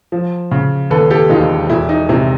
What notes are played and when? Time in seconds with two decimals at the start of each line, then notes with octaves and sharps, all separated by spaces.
0.12 F3
0.51 C#3
0.90 D#2 A4 B4
1.11 G4 A4
1.30 E1 D#4 F4
1.70 E1 E4
1.89 D#4
2.09 C3 E4